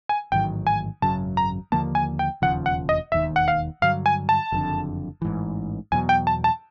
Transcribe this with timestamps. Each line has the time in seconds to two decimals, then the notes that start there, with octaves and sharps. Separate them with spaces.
0.09 G#5
0.32 A1 G#2 D#3 F#3 G5
0.67 G#5
1.02 G#1 F#2 C#3 F#3 A5
1.37 A#5
1.72 D#2 D3 F3 A#3 A5
1.95 G#5
2.19 G5
2.42 E1 D#2 C#3 F3 F#5
2.66 F#5
2.89 D#5
3.12 E1 D#2 D#3 E5
3.36 F#5
3.48 F5
3.82 G2 D3 F#3 F5
4.06 G#5
4.29 A5
4.52 F#1 F2 D3
5.22 A1 G#2 E3
5.92 E2 B2 F#3 G#5
6.09 G5
6.27 A5
6.44 A5